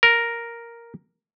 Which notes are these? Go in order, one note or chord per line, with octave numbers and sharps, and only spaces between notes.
A#4